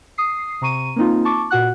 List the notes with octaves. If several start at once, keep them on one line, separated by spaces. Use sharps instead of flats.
D#6 C7
C3 A#5 C#6 D#7
A#3 C4 D#4 F4
A5 C#6 D6
A#2 F#4 F#5 F#6